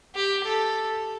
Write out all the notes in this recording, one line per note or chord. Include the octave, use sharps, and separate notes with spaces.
G4
A4